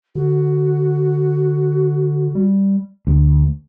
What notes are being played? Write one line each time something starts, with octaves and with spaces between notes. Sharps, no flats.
D3 F#4
G3
D2